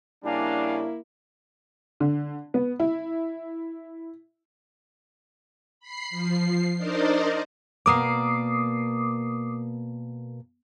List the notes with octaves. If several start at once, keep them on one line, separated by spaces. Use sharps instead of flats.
C#3 G3 A#3 D4 E4 F5 G#5 A#5
D3
B3
E4
B5 C7
F3 C7
D4 D#4 A#4 C5 D5 D#5
B2 A#3 D5 D6 D#6 C7